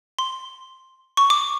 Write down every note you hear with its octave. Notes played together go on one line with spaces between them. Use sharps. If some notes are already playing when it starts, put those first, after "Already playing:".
C6
C#6
D6